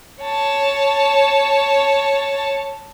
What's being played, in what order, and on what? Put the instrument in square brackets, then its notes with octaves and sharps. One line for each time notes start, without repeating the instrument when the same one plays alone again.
[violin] C#5 A5